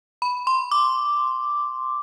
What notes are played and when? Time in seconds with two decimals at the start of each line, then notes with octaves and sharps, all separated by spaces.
0.22 B5
0.47 C6
0.71 D6